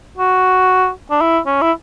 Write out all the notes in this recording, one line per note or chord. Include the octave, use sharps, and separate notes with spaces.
F#4
D4
E4
C#4
E4